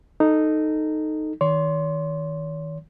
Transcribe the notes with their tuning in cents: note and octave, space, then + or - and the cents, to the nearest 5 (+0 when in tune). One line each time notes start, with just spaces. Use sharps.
D#4 -5 A4 +5
D#3 +25 C#5 +40 C6 +0